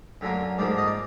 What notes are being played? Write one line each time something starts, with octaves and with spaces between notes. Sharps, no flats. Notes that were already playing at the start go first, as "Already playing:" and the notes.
F#2 D3 F#3 A#3
G#2 F3 A#3 D5
D#5
D5